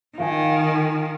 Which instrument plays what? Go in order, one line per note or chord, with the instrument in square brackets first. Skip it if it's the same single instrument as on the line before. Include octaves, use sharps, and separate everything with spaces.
[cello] D#3 [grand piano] F4 F5 G#5